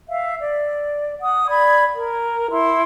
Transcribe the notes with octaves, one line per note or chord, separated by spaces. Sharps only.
E5 F5
D5
F#5 D#6
D5 B5 G#6
A#4
E4 C6